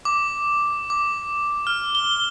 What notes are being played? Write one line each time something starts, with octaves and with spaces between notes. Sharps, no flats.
D6
D6
F6
G7